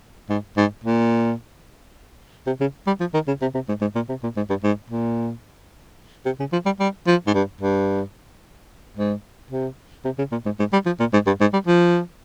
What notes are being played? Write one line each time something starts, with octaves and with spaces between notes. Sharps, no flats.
G#2
G#2
A#2
C3
C#3
G3
F3
D#3
C#3
C3
C3
G#2
G#2
A#2
C3
A#2
G#2
G2
G#2
A#2
C3
C#3
F3
G3
G3
F3
G#2
G2
G2
G#2
C3
C3
C#3
A#2
G#2
G#2
G3
F3
A#2
G#2
G2
G#2
G3
F3